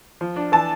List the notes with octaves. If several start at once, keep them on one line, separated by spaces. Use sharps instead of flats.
F3
D4
E3 A5